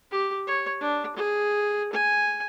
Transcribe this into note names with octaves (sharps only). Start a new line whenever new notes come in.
G4
C#5
D4
G#4
G#5